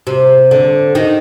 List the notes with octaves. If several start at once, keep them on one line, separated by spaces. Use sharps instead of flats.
C3
D3
D#3